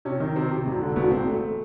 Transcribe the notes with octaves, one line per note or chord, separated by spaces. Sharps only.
C3 C#4
D#3
C3 C4
C3
E1
D3
E1 B3
E1 C4
A3